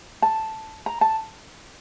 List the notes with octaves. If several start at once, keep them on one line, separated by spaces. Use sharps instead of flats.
A5
A#5
A5